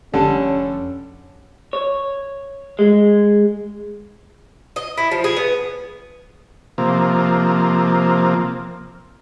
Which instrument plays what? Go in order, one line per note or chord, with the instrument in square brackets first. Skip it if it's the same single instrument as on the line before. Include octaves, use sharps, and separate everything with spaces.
[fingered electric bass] F1 [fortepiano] D3 G3 A4 [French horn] C#4
[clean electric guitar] C#5
G#3
[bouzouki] D#5
E4
F3
G#4
B3
[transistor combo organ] C3 F3 A#3